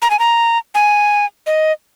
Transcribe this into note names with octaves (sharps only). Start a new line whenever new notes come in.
A#5
G#5
A#5
G#5
D#5